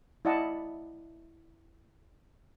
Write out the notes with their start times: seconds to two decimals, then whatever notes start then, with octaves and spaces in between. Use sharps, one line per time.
0.25 E4 D5 D#5 F#5 A5